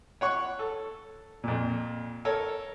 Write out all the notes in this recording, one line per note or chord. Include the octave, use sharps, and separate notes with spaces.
C#5 F#5 C#6
A4
F2 A#2
A4 A#4 C#5